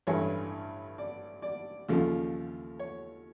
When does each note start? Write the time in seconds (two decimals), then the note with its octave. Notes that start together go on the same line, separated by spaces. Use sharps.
0.07 A1 G2 E3 A3 C#5
0.98 D5
1.42 D5
1.89 D#2 C#3 F3 A3
2.79 C#5